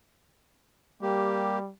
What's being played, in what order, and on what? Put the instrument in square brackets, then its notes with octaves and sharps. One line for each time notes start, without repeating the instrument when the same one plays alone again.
[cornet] G3 [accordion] A#3 G4